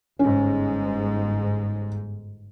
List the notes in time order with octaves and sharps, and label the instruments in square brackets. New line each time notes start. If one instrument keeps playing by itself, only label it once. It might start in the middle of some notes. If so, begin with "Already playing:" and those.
[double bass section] G1 G#2 [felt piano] C#4